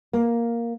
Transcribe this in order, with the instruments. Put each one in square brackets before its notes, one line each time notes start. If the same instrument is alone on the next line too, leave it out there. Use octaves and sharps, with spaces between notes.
[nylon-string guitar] A#3